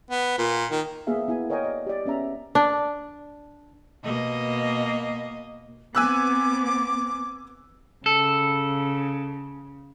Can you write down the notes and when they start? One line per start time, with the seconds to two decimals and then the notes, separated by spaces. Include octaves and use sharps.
0.11 B3
0.38 A#2
0.72 D#3
1.07 A#3 B3 G#4 E5 F5
1.28 B3 E4 G#5
1.50 A#4 C#5 D#5 F5 G5 G#5
1.64 D5 D#5
1.86 G4 D5
2.05 B3 C#4 E5 A#5
2.55 D4
4.04 B2 A#3 D#5
5.95 B3 C4 G#5 D6 E6 F#6
8.06 C#3 A4